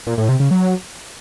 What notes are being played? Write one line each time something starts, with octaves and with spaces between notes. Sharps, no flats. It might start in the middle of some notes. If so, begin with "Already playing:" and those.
A#2
A2
C3
C#3
F#3